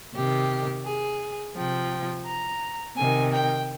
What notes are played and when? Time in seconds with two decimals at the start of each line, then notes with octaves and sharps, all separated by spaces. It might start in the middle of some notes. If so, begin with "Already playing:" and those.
0.14 C3 D#3 G4
0.85 G#4
1.55 C3 F3 G5
2.26 A#5
2.96 C3 D#3 G#5
3.32 G5